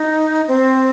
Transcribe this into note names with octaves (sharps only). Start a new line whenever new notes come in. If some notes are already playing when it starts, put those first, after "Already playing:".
Already playing: D#4
C4